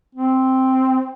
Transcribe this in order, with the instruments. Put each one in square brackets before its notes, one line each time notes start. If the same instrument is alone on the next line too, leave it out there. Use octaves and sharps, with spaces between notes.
[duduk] C4